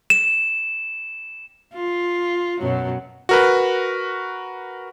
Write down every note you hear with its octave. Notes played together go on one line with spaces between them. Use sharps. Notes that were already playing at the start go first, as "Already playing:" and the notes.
E7
F4
F#2 B2 F#3
F#4 A#4 B4